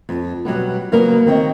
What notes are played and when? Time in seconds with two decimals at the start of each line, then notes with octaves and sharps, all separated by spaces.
0.09 F2
0.45 B2 F#3 G3 B3
0.92 C#3 F#3 A#3 B3 C#4 A#4
1.26 D#3 C4 C#5 D#5